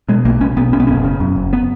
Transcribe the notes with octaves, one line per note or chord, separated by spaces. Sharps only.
B2 G#3
B1 A#3
B1 C#4
B1 B3
B2 C#4
B3
F#1 C#4
C#3
F#2
F#1
B3